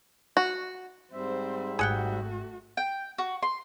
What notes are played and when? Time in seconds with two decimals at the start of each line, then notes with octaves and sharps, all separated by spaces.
0.37 F#4
1.13 G#2 G3 C4 C5 E5
1.79 G#1 A3 F#4 G#4 F#5 G5
2.77 G5
3.18 F#4
3.43 C6